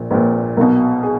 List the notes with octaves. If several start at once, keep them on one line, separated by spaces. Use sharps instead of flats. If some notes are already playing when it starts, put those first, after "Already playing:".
Already playing: A#1 A#2
A#1 A#2 B4
B1 B2 A#4
G#4